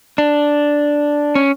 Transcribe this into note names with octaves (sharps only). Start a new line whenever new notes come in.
D4
C#4